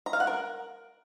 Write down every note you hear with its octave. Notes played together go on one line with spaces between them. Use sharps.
A#5
F5
F#5
A#4